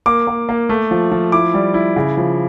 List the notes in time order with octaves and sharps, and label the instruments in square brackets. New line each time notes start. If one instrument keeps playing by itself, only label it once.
[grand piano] A#3 D6
A#3
A#3
A3
F3
F3
E4 D6
G3
E4
C#3
F3